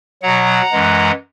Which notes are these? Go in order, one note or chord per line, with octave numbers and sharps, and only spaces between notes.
B2 F#3 F#5 A#5
F#2 E3 G#3